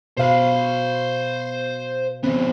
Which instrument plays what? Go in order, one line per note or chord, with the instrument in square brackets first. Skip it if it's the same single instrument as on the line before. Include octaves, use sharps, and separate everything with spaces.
[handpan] B2 F5 [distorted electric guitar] C5 B5
[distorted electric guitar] F3 B3 [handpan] C4